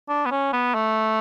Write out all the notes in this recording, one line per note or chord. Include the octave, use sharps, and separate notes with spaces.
D4
B3
C#4
B3
A3